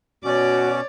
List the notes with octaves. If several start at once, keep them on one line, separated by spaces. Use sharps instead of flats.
B2 C#4 F#4 C#5 D5 D6